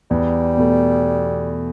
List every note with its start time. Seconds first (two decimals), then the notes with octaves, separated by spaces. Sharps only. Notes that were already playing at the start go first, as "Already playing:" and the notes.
0.10 E2 G3
0.57 B2 A3